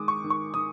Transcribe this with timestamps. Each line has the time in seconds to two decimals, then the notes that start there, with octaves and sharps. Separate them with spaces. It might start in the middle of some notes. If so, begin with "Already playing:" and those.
Already playing: D#3 G#3 D6 D#6
0.08 C#6
0.24 D#3
0.30 C#6
0.54 D#3 D#6